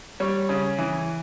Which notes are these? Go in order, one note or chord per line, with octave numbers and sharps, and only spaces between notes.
G3 C#5
C#3
E3